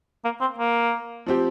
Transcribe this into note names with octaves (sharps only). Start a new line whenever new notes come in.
A#3
C4
A#3
F3 C4 G4